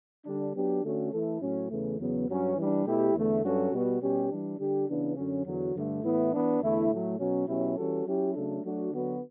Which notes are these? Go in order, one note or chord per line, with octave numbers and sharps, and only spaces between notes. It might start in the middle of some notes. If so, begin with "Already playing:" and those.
D3 G3 D4
F#3 B3 D4 G4
D3 A3 C#4 F#4
E3 A3 E4 A4
A2 F#3 C#4
E2 C#3 E3 A3
E2 C#3 F#3 B3
G2 F#3 C#4
E3 G3 D4
B2 A3 E4 G4
E2 D3 A3
G2 F#3 C#4 F#4 A4
B2 G3 B3 F#4
B2 G3 C#4 G4
E3 G3 D4
D3 G3 D4 G4
C#3 E3 B3 D4
F#2 D3 F#3 C#4
E2 D3 F#3
G2 D3 A3
A2 E3 B3 E4
E3 B3 D4
E2 D3 A3 E4
A2 F#3 A3
B2 F#3 C#4
B2 F#3 C#4 E4 G4
E3 G3 C#4 F#4 A4
F#3 C#4 E4 G4
C#3 F#3 A3 D4 A4
F#3 A3 D4 F#4
D3 F#3 B3 F#4